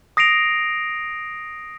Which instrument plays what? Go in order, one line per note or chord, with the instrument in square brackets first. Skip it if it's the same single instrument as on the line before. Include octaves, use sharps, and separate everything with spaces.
[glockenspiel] D#6 A#6 C7 D7 F7